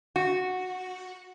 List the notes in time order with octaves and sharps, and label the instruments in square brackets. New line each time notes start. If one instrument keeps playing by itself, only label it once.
[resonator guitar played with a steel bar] F#4